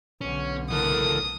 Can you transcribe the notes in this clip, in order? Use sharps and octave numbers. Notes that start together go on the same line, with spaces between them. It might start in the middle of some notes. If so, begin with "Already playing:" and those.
B1 D3 C#4
C#2 E3 A4 A#4 D#6